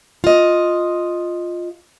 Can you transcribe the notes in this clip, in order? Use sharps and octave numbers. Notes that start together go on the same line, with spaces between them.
F4 D#5